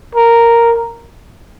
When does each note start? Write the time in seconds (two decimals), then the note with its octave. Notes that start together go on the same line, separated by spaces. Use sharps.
0.15 A#4